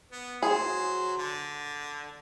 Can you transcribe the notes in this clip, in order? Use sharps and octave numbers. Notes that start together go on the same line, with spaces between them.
B3
F#3 G#4 C5
D3